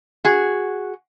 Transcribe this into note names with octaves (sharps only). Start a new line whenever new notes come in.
F#4 G#4